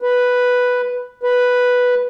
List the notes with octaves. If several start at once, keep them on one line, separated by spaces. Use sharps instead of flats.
B4
B4